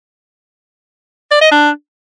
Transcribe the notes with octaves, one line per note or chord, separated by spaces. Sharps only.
D5
D#5
D4